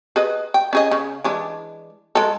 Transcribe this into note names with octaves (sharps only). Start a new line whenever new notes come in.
G#4 B4 D#5
G5
C#4 G#4 D#5
C#3
E3 G#3 D4
G#3 A4